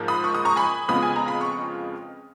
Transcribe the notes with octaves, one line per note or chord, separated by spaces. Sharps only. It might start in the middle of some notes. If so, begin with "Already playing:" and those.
Already playing: G#2 F3 A#3
B5 D#6
C#6
D#6
A#5 C#6
G#5 B5
F2 C#3 G#3 B3 F4 B5 D#6
G#5
A#5
B5
C#6